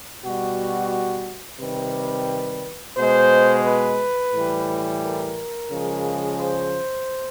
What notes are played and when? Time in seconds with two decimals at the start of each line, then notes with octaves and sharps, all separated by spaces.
0.23 B2 G3 F#4
1.60 C3 D#3 G3 B4
2.97 B2 G#3 C5
3.66 B4
4.34 A2 E3 G3
5.03 A#4
5.70 C#3 F3 G#3
6.39 C5